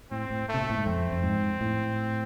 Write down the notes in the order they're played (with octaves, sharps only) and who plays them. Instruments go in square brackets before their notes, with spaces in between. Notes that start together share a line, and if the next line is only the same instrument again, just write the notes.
[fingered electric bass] A2 [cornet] C4
[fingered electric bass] A2
[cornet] A3
[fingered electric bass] C3
B2
A2
G#2
[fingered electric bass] F2 [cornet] C4
[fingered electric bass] F2
G#2
A2